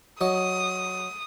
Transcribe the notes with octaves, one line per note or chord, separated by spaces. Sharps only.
F#3 D#5 D#6